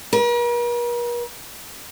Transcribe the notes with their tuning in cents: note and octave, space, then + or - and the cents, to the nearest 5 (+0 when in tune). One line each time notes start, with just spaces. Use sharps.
A#4 +45